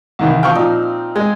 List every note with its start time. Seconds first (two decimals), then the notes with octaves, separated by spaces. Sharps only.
0.19 C2 D#3 E3
0.43 F3 C4 F5 G5 C#6
0.55 A#2 D#4
1.16 G#3 G#5